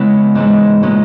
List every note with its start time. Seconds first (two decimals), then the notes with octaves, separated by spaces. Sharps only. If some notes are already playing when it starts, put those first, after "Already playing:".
Already playing: C#3 G#3 B3 E4
0.35 G#2 E3 G#3 C#4 E4
0.83 A#2 G#3 C#4